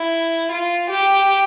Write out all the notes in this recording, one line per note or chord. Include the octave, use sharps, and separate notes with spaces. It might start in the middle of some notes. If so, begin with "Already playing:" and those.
Already playing: E4
F4
G4